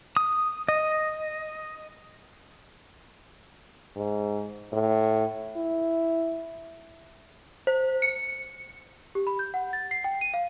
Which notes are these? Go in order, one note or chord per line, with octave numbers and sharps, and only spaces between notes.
D#6
D#5
G#2
A2
E4
C5
C#7
G4
B5
G6
F#5
A6
C7
G5
D#7
F5